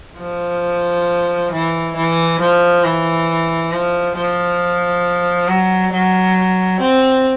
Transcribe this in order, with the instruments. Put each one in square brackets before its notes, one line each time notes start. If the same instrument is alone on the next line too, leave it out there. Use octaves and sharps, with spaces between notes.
[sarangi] F3
E3
E3
F3
E3
F3
F3
F#3
F#3
C4